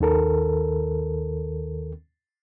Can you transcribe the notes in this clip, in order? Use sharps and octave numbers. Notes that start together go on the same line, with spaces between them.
D#2 D#3 A4 A#4